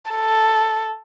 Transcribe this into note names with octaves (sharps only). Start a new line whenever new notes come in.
A4